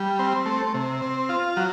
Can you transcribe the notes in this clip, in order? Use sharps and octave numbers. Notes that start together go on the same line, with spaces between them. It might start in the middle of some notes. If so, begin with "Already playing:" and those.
Already playing: G3
C4
A3
C3
C4
F4
F#3